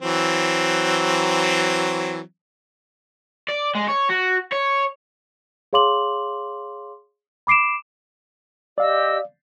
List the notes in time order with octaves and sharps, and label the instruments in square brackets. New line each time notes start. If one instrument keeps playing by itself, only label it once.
[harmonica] E3 F#3 C4
[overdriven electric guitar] D5
G#3
C#5
F#4
C#5
[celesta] G#4 C#5 F5 C6 D6 F#7
B5 D6 C7 D7 E7
[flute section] G4 D#5 E6 [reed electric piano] D5 F5